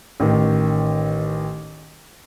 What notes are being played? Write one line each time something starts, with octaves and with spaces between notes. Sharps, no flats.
A1 D#3